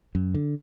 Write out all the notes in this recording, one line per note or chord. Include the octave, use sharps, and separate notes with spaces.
F#2
D3